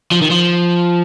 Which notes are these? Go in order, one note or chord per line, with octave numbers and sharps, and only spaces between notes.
F3
D#3
F3